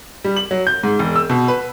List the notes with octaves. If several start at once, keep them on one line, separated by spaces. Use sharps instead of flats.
G3
F#7
F#3
G6
G#2
E1
E6
B2
B4